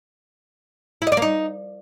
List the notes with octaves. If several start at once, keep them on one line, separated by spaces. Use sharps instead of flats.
E4
D#5
D5
A#3
D#4